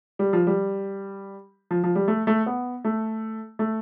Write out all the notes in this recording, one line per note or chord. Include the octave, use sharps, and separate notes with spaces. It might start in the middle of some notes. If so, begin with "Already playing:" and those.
G3
F3
G3
F3
F3
G3
A3
A3
B3
A3
A3